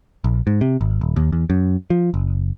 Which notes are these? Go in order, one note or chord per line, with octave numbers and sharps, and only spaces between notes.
A#1
G#2
C3
G#1
D#1
D#2
E2
F#2
F3
F#1